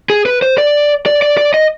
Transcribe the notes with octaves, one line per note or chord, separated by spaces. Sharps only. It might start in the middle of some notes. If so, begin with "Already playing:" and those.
G#4
B4
C5
D5
D5
D5
D5
D#5